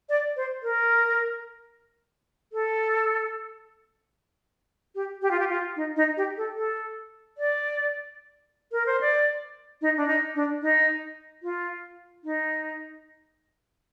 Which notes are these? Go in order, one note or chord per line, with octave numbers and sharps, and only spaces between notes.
D5
C5
A#4
A4
G4
G4
F4
G4
F4
D#4
D#4
G4
A4
A4
D5
A#4
C5
D5
D#4
D4
D#4
D4
D#4
F4
D#4